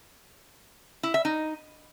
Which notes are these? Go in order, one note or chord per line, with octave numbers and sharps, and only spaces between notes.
E4
E5
D#4